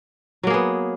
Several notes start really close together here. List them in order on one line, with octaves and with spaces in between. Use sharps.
F#3 A#3 G#4 B3